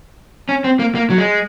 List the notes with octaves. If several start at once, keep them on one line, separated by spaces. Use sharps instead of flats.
C#4
C4
A#3
A#3
F#3
G#3